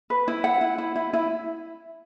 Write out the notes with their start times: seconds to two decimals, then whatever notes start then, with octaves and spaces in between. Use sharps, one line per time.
0.10 B4
0.28 E4
0.44 F#5
0.61 E4
0.78 E4
0.96 E4
1.13 E4